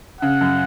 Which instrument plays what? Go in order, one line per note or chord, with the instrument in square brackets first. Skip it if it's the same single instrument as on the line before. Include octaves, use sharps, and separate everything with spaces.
[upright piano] C#3 [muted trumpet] F#5
[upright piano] F#2